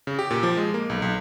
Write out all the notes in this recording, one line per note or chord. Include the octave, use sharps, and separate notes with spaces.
C#3
G4
A#2
F3
G#3
A#3
B1
B1